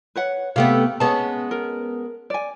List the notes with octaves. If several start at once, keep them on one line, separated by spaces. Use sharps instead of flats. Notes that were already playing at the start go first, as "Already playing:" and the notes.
B4 C#5 F#5
C3 A3 B3 G4 F5
G#3 B3 C#4 A5
A#4
D5 G#5